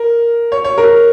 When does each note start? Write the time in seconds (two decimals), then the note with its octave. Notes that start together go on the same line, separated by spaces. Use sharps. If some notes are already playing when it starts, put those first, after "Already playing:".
Already playing: A#4
0.52 C#5
0.65 C#5
0.78 A#4